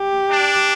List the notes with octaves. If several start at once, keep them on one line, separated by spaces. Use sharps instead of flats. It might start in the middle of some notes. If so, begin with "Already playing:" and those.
Already playing: G4
D4